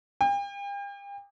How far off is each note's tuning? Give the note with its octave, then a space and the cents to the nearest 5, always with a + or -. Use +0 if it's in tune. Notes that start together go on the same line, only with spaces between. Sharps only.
G5 +40